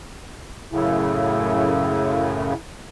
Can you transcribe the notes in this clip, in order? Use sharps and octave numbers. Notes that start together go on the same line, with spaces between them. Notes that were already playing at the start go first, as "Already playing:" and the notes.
F#2 A2 C#3 E4